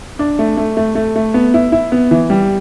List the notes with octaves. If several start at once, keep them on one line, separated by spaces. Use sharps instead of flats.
D4
A3
A3
A3
A3
A3
B3
E4
E4
B3
E3
G3